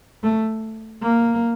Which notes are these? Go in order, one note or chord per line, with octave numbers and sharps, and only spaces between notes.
A3
A#3